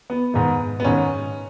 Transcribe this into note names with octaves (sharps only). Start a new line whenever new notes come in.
B3
G#2 D#3 B3
B3
G#2 D#3 C#4